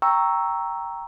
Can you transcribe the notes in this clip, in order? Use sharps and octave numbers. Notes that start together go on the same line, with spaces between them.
G5 A#5 C#6 E6